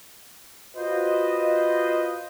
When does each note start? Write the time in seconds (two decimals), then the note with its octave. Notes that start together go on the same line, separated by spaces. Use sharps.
0.77 F4 F#4 B4 C5 D#5